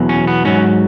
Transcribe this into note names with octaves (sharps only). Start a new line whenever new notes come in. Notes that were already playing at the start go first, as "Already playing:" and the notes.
Already playing: E2 B2 F#3
C#4
B3
G#2 F#3 C#4